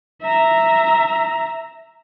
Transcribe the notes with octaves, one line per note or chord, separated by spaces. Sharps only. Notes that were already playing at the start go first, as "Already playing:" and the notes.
E5 A#5